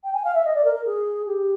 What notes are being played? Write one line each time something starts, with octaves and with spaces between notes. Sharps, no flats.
G5
G#5
F5
E5
D#5
D5
A#4
A#4
G#4
G4